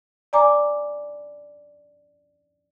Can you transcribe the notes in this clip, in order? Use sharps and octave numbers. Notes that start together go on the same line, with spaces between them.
D5 G#5 A#5 D6